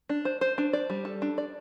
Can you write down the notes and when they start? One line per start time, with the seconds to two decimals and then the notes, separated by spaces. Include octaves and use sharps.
0.09 D4
0.25 C5
0.41 C5
0.58 D4
0.73 D5
0.90 G3
1.05 A4
1.22 D4
1.38 D5